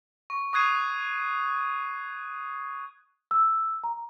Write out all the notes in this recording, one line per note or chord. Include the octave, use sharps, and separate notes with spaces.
C#6
C#6 D#6 F#6 G#6 C7 D#7
E6
A#5